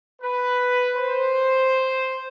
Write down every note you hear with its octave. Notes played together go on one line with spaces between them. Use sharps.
B4
C5